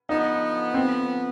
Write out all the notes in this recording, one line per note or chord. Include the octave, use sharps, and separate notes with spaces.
D3 F3 B3 D#4
C4